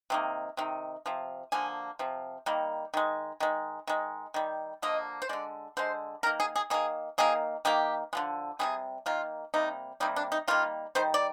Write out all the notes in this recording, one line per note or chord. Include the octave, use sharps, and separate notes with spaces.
C3 D#3 A#3
C3 D#3
C3 F3
D3 F3 A#3 G#5
C3 F3
D#3 G3 A#3
D#3 G#3
D#3 G#3
D#3 G#3
D#3 G3
D3 F3 A#3 D#5
C5
D3 G#3 D5
D3 G#3 C5
D#3 A#3 A#4
G#4
G#4
D#3 A#3 G#4
D#3 A#3 G#4
D#3 A#3 G4
D3 F3 G#3
C3 D#3 G3 G#4
D#3 A#3 F4
C3 G3 A#3 D#4
C3 G3 A#3 D#4
D4
D#4
D#3 G3 A#3 F4
D#3 G3 C5
D5